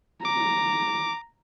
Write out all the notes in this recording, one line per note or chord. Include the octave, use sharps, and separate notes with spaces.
A#5 D6